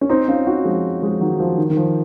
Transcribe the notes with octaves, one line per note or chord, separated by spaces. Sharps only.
C#4
C4 D#4
C#4 F4
D#4 F#4
F3 G#3
F3 G#3
D#3 F#3
F3
D#3
D#3
F3